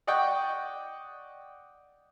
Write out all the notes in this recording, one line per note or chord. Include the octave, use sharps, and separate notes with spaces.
D5 D#5 F#5 G5 C#6